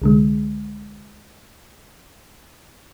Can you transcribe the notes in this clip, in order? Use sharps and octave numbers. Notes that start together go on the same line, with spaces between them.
C2 D3 G#3